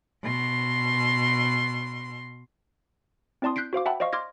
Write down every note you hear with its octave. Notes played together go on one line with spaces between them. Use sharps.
B2 C6
C4 E4 D5 A5 C6 D#6
F#6 G6 B6 C7 D7
F#4 C5 F5 D6
E5 F#5 G5 A5 B5
C5 D5 D#5 F5 C#6
C6 D6 F6 G#6 A#6